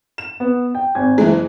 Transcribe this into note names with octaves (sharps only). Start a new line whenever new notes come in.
E7
B3
G5
G#1 G#5 G#6
F#1 E3 G#3